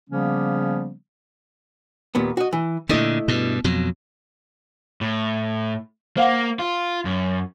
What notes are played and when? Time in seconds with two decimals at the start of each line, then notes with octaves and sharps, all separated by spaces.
0.10 C#3 F3 G3 A#3 B3 C#4
2.15 D#2 A#2 B3
2.37 F#4 D#5
2.53 E3
2.89 A#2 D3 A3 E4 D#5
3.28 G2 B2
3.64 F2 B2 F#3
5.01 A2
6.17 A#3 C5 F5 F#5
6.59 F4
7.05 F#2